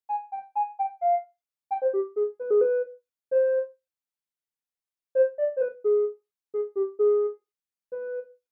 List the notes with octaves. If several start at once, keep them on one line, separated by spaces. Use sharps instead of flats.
G#5
G5
G#5
G5
F5
G5
C5
G4
G#4
B4
G#4
B4
C5
C5
D5
C5
B4
G#4
G#4
G4
G#4
B4